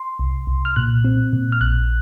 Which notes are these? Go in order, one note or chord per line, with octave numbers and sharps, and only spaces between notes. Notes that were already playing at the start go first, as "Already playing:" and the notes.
Already playing: C6
C2
C2
F6
A#2 F#6
C4
A#2
F6
A#1 F#6